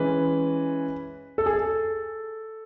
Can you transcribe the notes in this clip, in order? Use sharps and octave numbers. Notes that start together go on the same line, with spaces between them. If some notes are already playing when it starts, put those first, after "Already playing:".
Already playing: E3 G#3 C#4 B4
A4
G#4
A4